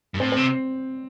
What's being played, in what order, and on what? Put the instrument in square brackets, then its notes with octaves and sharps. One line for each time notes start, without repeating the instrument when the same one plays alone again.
[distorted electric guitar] G2
[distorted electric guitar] A2 [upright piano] C4
[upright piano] C4
[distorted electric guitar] C3